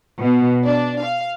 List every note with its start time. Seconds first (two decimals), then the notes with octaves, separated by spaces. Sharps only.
0.20 B2
0.64 D4
1.02 F5